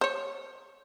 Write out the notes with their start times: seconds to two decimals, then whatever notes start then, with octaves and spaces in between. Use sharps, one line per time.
0.01 C5 C#5